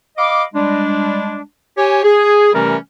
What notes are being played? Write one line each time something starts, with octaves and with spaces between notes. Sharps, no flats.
D#5 F5 B5 D6
G3 G#3 D4
G4 C#5 G#5
G#4
C3 E3 G3 A3 C#4 A#4